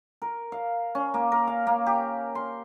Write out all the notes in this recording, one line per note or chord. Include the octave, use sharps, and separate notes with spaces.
A#4
F5
C#4
A#3
A#4
F5
A#3
G4
C6